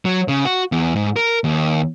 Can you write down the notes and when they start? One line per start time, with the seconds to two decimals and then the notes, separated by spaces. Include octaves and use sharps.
0.05 F#3
0.28 C#3
0.45 F#4
0.72 E2
0.96 G#2
1.16 A#4
1.44 D#2